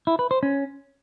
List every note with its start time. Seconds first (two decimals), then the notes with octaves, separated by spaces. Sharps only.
0.07 E4
0.19 B4
0.31 C5
0.43 C#4